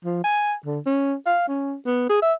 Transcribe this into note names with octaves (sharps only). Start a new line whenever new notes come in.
F3
G#5
D3
C#4
F5
C#4
B3
G#4
E5